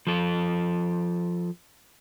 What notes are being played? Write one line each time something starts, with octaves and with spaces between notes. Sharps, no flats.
F3 A4